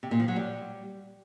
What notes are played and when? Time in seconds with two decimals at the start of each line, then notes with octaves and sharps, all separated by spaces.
0.03 C3
0.11 A#2
0.20 F3
0.28 F#3
0.36 G3